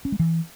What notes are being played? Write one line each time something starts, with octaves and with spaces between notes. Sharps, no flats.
C#4
G#3
E3